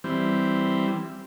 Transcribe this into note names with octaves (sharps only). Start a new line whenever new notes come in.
E3 G3 C4